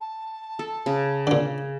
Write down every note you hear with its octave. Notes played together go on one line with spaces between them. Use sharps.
A5
A4
C#3
A#2 D3